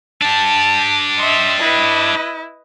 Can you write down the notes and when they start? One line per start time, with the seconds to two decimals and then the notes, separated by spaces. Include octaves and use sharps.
0.22 D4 G4 A5
1.19 D#5 E5 C6
1.60 E4 B4 D#5